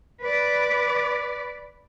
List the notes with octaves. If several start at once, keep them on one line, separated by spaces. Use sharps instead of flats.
B4 D5